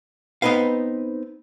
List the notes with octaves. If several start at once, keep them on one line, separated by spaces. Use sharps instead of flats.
B3 C4 D#4 B4 F5